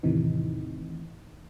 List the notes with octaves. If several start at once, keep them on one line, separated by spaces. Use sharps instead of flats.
E2 A2 C3 D#3 E3 D#4